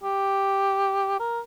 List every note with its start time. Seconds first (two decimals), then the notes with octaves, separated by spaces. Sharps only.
0.03 G4
1.20 A#4